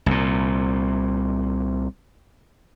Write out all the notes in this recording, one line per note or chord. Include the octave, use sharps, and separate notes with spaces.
C2 A#2